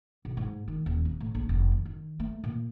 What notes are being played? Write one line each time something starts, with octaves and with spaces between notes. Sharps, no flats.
B1
G#2
D#3
D#1
C4
A2
A#1
F1
D#3
D#3
A3
A#2